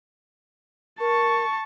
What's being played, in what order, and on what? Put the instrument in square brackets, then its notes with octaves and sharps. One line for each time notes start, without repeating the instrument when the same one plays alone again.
[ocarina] A#4 [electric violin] A5 C#6